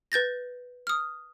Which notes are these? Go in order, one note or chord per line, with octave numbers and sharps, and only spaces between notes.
B4 G6 A6 A#6
D#6 F6